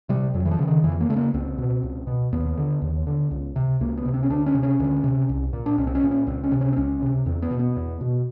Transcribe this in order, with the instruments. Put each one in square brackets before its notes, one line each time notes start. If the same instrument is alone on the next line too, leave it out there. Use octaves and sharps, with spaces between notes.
[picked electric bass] C3 G3
F2 F#3
E3
F3
C#3 E3
D#3
F2 E3
A#3
C#3 A3
A#3
C#2 C4
B2
C#2
B2
D#2 B3
D3
D#2
D3
C#2
C3
C#2 A#3
B3
C3
C4
C#4
D2 D4
C#4
C3
C#4
D2
C3
C2
A#2
D4
C2 C#4
C4
C#4
A#2
C#4
C#2 C4
C#4
C3
C#4
C4
C#2 C#4
C3
E2 C4
B3
B2
B3
E2
B2